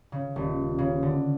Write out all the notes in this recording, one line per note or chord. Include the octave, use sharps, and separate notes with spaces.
C#3
D#1
C#3
D3